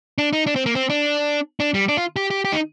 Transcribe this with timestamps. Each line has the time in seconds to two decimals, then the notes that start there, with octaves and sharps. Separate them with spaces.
0.18 D4
0.33 D#4
0.47 D4
0.56 C4
0.66 A#3
0.75 C4
0.90 D4
1.60 D4
1.74 G3
1.89 D4
1.97 F4
2.16 G4
2.31 G4
2.45 G4
2.52 D#4